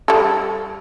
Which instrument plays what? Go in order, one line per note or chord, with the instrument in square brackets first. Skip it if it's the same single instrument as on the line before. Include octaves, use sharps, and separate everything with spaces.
[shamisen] G3 A4